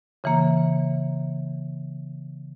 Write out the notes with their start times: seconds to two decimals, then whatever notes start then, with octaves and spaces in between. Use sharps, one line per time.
0.24 C#3 E3 A#3